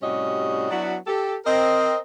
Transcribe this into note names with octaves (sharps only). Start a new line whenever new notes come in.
A2 C3 G3 C#4 F#4 D#5
F#3 B3 D4 E4 F#4
G4 A4
C4 A#4 D#5